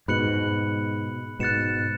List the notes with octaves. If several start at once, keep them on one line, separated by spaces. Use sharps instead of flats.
G#2 B2 B5 F#6 C#7 F#7
G#2 B2 F#6 A6 C#7 E7